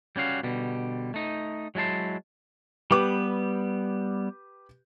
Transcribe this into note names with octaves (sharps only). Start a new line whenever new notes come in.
G3 C#4 F#4 F5
B2 D3 G3
A3 D#4
F#3 G#3 E4 A5 C6
G3 B3 G4 B4 D6